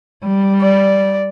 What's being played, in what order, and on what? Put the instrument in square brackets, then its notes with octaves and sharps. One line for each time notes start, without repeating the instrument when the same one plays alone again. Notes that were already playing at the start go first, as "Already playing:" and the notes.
[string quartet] G3
[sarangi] D5